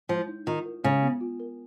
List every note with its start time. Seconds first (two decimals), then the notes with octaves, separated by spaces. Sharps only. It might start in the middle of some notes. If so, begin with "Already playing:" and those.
0.09 F3 G#3
0.28 D#4
0.47 D#3 F4
0.65 A#4
0.84 C#3 G#3
1.02 B3
1.21 F4
1.40 A#4